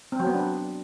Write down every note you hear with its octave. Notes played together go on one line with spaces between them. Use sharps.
C4
F#3
B3
D4